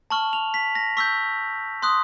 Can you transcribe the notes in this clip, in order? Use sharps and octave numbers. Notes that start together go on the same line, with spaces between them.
A5 C#6 F6 F#7
F7
B6
A#6
C#6 E6 G6 B6
C6 D#6 F#6